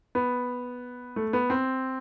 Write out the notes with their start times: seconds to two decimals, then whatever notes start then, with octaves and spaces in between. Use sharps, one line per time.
0.15 B3
1.16 A3
1.33 B3
1.50 C4